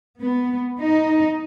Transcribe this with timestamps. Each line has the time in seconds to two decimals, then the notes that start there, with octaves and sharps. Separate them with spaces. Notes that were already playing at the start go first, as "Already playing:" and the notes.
0.19 B3
0.79 D#4